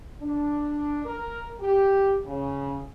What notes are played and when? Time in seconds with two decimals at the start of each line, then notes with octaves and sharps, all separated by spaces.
0.22 D4
1.05 A#4
1.61 G4
2.25 C#3